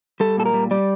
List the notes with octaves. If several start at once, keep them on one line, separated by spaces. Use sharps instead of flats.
G3 A4
A#2 A4
A#4
G3
G3 D5